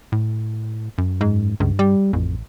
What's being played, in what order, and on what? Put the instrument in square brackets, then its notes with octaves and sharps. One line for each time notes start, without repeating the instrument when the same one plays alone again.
[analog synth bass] A2
F#2
[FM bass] G#2
[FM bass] C#2 [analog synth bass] G2
[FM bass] G3
[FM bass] A1 [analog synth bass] F2